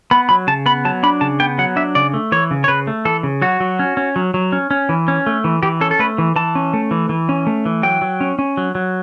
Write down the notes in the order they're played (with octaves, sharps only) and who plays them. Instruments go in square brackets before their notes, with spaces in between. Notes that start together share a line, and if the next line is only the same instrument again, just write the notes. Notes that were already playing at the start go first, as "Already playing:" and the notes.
[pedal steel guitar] B3 B5
F#3 B5
C#3 A5
B3 B5
F#3 A5
D4 B5
C#3 A5
B3 G5
F#3 F#5
D4 E5
C#3 D5
A3
E3 C#5
C#3
C#5
C#3 B4
A3
E3 A4
C#3
F#3 F#4
F#3
C#4
C#4
F#3
F#3
C#4
C#4
E3
C#4
A3
E3
E3 G4
C#4 A4
A4
A3 B4
E3
E3 A5
C#4
A3
E3
E3
C#4
A3
E3
F#3 G5
F#3
C#4
C#4
F#3
F#3